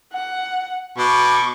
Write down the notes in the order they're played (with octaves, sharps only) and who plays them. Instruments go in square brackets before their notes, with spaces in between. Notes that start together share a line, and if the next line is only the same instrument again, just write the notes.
[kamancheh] F#5
[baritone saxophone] B2 [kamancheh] C#6 D6